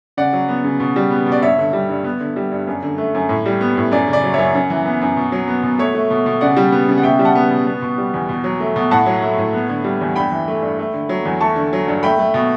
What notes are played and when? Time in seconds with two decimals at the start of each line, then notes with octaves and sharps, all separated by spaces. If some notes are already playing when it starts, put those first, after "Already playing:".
0.17 C#3 D5 F#5
0.33 F#3
0.48 B3
0.64 C#3
0.80 B2
0.96 G3
1.11 B3
1.26 B2
1.32 D5
1.42 G2 C#5 E5
1.59 D3
1.73 G3
1.89 G2
2.04 B3
2.20 D3
2.36 G3
2.52 G2
2.67 F#2
2.83 D3
2.98 A3
3.15 F#2
3.29 A2
3.46 G3
3.61 B3
3.77 A2
3.92 F#2 D5
4.08 C#3
4.13 D5
4.24 F#3
4.34 F#2 C#5 E5
4.55 F#2
4.70 E3
4.86 B3
5.02 F#2
5.17 B2
5.32 F#3
5.48 B3
5.63 B2
5.79 A3 C#5 E5
5.95 A3
6.10 B2
6.26 B2
6.41 C#3 D5 F#5
6.57 G3
6.72 B3
6.89 C#3
6.97 F#5
7.03 B2 E5 G5
7.19 G3
7.25 F#5 A5
7.35 B3
7.51 B2
7.67 B3
7.82 B2
7.98 G3
8.14 E2
8.29 B2
8.44 F#3
8.60 A3
8.76 B2
8.91 A2 F#5 A5
9.06 F#3
9.22 A3
9.38 A2
9.53 B3
9.69 D3
9.84 G3
10.01 E2
10.16 G2 G5 B5
10.32 E3
10.48 A3
10.62 G2
10.79 A3
10.93 D3
11.09 F#3
11.25 E2
11.40 A3 A5 C#6
11.56 D3
11.73 F#3
11.88 G2
12.03 A3 G5 B5
12.19 A3
12.34 B2